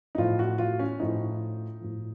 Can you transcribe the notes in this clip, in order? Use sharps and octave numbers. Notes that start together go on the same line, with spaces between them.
D#4
A2 F3 F4
F#4
F4
C#4
A2 F3 D#4
A2 F3